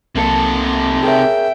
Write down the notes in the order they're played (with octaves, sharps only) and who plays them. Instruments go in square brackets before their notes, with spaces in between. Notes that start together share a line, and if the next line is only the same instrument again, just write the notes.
[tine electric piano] C2 A#3 C#7 [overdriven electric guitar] C3 A4
[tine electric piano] G#4 A#4 C#5 [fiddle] E5 G5